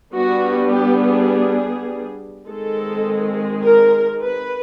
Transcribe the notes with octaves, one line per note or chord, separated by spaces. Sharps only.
G3 B3 D4 F#4
G4
G#4
D#3 G#3 C4 A4
A#4
B4